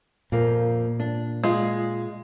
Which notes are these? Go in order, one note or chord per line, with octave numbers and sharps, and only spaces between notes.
F2 A#2 F3 A#3
D4
G#3 F4